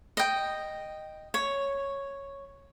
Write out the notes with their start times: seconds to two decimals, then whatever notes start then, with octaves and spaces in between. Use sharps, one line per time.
0.17 D#5 G5
1.34 C#5